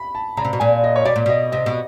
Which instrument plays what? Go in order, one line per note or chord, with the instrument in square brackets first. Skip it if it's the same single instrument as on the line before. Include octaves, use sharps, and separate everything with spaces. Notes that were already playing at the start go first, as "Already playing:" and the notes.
Already playing: [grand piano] B5
A5
[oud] C#3 [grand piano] A#5
[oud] C3
B2
[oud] A#2 [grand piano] G#5
[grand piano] D#5
C#5
[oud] B2 [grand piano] D5
[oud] A#2
[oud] B2 [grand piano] D#5
[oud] C3 [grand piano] D#5
[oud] B2